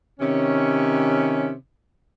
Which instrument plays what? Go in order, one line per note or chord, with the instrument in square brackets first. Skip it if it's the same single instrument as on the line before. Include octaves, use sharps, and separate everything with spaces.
[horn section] C3 D#3 C#4